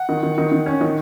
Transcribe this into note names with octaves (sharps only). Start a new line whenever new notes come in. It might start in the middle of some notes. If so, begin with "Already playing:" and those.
Already playing: F#5
D#3
D#3
D#3
D#3
C#4
D#3